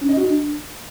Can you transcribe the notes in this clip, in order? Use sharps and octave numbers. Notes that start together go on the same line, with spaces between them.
C#4
D#5
F#4
D4